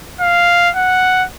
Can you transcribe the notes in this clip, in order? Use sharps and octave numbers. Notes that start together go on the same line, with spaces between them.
F5
F#5